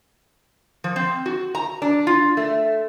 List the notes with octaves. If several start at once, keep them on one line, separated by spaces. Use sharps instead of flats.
F3
C4
F#4
A#5
D4
F4
A3